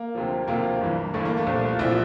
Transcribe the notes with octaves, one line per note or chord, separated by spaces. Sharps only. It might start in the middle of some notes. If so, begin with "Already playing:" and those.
Already playing: A#3
D2 C3 F3
D2 C3 F3 A#3
G1 G2 E3
G1 G2 E3 A3
A#3
A3
C2 A#2 F3
F4
C2 A#2 F3 E4